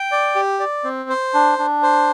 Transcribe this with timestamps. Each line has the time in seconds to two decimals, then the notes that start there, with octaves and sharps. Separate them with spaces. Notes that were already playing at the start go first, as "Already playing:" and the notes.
Already playing: G5
0.12 D5
0.35 G4
0.60 D5
0.84 C4
1.10 C5
1.34 D4
1.59 D4
1.83 C5